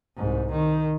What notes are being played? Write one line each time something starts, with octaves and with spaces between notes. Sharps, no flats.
C2 G#2
D#3